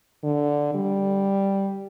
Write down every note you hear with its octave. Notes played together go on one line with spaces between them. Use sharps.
D3
G3